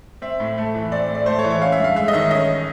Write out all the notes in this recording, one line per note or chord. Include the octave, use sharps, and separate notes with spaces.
C4 E5
A2
A3
E3
C4 D5
A2
D5
A3 C5
C#5
E3
C#5
C#4 F5
E5
G2
F5
G#3 E5
D#5
D#3 E5
C#4 D#5